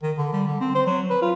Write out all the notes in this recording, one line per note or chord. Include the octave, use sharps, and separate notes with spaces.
D#3
D3
G3
D3
C4
C5
F#3
B4
F4